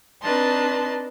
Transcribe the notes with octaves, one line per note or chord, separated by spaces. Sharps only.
C4 D4 D#4 B4 A5 C6